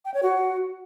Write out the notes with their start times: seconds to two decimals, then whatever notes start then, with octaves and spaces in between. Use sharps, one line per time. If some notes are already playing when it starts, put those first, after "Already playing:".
0.05 G5
0.14 C#5
0.23 F#4